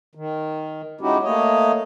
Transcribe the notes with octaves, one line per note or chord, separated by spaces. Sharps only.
D#3
G#3 C#4 D#4 E4 F#4 G4
A3 A#3 C#5 D#5